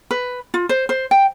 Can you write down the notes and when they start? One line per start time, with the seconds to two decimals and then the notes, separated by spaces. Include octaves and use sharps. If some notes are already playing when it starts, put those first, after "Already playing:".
0.11 B4
0.54 F4
0.69 C5
0.89 C5
1.11 G5